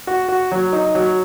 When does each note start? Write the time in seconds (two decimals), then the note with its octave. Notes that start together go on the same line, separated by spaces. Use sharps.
0.07 F#4
0.28 F#4
0.51 F#3
0.73 D#4
0.95 F#3